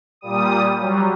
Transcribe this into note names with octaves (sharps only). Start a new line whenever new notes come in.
A#2 G3 D#6
F#3 G3